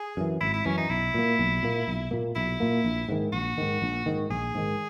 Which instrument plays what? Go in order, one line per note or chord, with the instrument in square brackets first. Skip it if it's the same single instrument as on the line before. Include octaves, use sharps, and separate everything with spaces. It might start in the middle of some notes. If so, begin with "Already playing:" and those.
Already playing: [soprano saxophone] G#4
[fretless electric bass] F#2 E3
[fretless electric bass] G#1 [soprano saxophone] E4
[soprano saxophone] E4
[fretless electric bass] F#2 E3 [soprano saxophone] C#4
[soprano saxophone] D#4
[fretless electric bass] B1 [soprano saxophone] E4
[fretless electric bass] A#2 A#3
B1
A#2 A#3
B1
A#2 A#3
[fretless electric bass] B1 [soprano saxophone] E4
[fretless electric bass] A#2 A#3
A#1
G#2 D#3
[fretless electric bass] A#1 [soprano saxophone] F#4
[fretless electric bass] G#2 D#3
A#1
G#2 D#3
[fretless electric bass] A#1 [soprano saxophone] G#4
[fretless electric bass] G#2 D#3